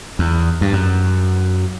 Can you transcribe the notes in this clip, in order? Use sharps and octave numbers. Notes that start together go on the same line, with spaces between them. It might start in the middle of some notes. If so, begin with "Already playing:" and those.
E2
G2
F#2